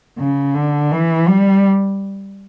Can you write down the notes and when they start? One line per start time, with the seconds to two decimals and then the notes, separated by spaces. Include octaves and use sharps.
0.18 C#3
0.55 D3
0.92 E3
1.28 G3